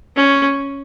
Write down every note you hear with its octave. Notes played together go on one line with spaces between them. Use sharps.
C#4